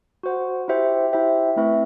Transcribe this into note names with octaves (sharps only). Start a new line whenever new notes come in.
F#4 C5 F#5
E4 G4 C5 E5 G5
E4 G4 C5 E5 G5
A3 C4 E4 B4 E5